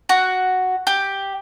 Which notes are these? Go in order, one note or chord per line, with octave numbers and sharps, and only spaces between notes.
F#4
G4